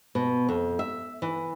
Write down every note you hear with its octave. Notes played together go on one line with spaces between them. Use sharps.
B2
F2
E5
E3